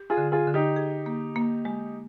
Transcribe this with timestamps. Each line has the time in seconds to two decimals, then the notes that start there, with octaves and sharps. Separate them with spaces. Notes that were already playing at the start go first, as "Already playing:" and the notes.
Already playing: G4
0.10 F4 G#4
0.17 D3
0.32 F4 G#4
0.47 D3
0.54 D#4 G4
0.76 G#4
1.06 A#3
1.36 A#3
1.65 G#3